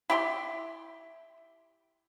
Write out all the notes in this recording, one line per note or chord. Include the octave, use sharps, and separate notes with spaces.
E4 G4 C6